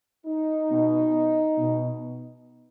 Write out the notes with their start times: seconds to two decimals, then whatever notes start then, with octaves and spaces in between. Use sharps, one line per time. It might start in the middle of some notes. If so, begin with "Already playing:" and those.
0.27 D#4
0.71 B2
1.58 B2